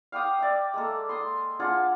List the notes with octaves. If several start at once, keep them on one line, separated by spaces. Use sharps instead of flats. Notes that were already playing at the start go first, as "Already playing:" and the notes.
F5 G5 D6 D#6
D5 E5
G#3 A#3 A4
C6 D#6
D4 F4 G#4 F#5